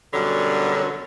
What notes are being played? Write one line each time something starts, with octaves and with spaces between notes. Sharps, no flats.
F#2 B2 D3 F#3 G3 C#5